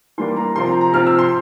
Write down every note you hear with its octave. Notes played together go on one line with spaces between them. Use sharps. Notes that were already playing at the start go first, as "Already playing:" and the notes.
E3 G3 A#3 D4 C6
A#5
C3 F3 C4 C6
A#5
A#5
C3 F3 C4 F6
E6
C6